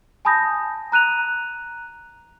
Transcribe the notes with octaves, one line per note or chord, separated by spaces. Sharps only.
G#5 A5 B5 D#6 G6 A#6
A#5 F#6 D#7 F7